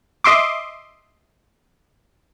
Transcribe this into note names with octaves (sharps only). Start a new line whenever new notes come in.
D#5 E5 C6 D6